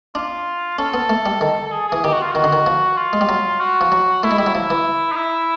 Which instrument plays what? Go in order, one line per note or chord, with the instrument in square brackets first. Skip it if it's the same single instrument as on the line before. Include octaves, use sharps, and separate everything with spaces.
[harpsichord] D4 [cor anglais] F4
[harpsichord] C#4 [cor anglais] A4
[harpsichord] B3
A3
G3
[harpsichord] D#3 [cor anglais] A4
[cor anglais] A4
G#4
[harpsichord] E3 [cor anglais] G#4
[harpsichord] D#3 [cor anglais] G4
[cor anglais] F#4
F4
[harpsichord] D#3 [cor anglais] F#4
[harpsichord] D3
D#3
F3
[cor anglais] F4
[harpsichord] G#3
G3
F#3
[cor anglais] F#4
[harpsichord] F3
F#3
[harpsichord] A3 [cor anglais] E4
[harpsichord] G#3
[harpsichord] G3 [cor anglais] E4
[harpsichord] F#3
[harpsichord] F3 [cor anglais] E4
[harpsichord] E3
[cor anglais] D#4
E4